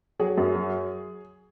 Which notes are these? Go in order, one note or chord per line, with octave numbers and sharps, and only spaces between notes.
F#3 G#4
F#2
F#3